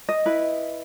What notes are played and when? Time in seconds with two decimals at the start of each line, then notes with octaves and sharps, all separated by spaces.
0.09 D#5
0.26 E4 B4